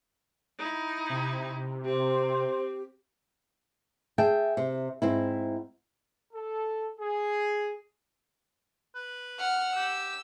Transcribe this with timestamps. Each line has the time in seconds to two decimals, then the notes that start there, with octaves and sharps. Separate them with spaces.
0.58 D#4 E4
1.10 C3
1.85 C4 G4 C5
4.18 G#4 E5 G5 A5
4.57 C3
5.02 G#2 C4 E4
6.34 A4
7.00 G#4
8.95 B4
9.39 F#5 F6
9.76 G4 E6